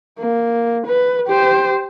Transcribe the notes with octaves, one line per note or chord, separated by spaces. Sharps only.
A#3
B4
G4 C5